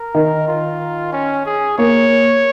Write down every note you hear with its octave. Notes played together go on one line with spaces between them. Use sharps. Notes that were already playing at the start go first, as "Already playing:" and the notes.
Already playing: A#4
D#3
F4
C#4
G#4
A#3 C#5